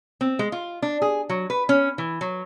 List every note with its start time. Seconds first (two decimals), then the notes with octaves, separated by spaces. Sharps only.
0.21 C4
0.39 G#3
0.52 F4
0.82 D4
1.02 G#4
1.29 F#3
1.50 B4
1.69 C#4
1.98 E3
2.21 F#3